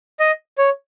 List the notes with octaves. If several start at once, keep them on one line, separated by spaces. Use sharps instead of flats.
D#5
C#5